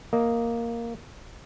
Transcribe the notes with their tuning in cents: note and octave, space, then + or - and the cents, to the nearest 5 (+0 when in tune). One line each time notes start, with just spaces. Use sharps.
A#3 +0 D#5 +0